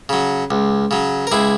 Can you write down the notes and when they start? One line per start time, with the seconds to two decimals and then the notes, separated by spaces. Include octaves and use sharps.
0.09 C#3 F#3
0.51 C#2
0.91 C#3 F#3
1.27 A#4
1.32 C#2 E4 G#4